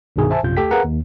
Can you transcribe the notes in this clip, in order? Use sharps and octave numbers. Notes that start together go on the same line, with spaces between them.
C2 G2 B2 D#3 G#4 A#4
C5 E5 G#5 A5
A#1 F#2 C3 F4 G6
D#2 A3 G4 A4 G5 B6
G#4 A#4 B4 F5 F#5 A#5
D#2